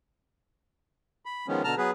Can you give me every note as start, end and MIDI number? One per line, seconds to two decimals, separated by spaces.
1.25 1.47 83
1.48 1.63 51
1.48 1.63 53
1.48 1.63 56
1.48 1.63 59
1.48 1.63 61
1.64 1.75 47
1.64 1.75 50
1.64 1.75 81
1.64 1.75 82
1.64 1.75 89
1.78 1.91 54
1.78 1.91 59
1.78 1.91 68
1.78 1.91 71